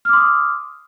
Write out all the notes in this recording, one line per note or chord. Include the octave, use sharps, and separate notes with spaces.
C6 D6 D#6 F6